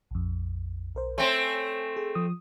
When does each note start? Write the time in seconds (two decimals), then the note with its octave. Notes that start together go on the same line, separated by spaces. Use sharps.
0.11 A#1 F2
0.95 B1 A#4 C5
1.18 A3 C4 C#5 G#5 C6
1.96 G#4
2.15 F3 D#6